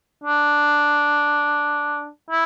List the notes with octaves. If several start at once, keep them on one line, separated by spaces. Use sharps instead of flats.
D4
E4